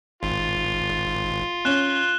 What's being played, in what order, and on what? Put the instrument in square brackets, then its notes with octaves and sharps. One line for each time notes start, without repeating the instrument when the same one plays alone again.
[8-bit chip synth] G#1 [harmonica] F4
[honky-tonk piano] C#4 [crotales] F#6 E7 G7